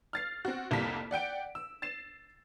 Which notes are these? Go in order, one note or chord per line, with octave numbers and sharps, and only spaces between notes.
F6 A6 C7
C4 F#4
F1 C2 F2 G3 A#3 B6
D5 F#5 G5 D7
E6
A6 C7 E7